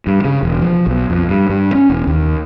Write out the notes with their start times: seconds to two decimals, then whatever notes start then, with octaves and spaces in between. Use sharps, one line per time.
0.07 G2
0.25 C#3
0.43 E1
0.61 F3
0.87 B1
1.10 F2
1.29 G2
1.50 G2
1.75 C#4
1.90 E1
2.07 D#2